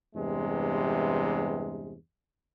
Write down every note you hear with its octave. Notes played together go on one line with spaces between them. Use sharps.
E2 G2 C3 G#3